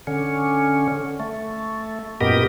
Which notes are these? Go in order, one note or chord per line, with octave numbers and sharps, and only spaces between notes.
D3 C#4
A3
F#2 A#2 B3 G4 A#4 D#5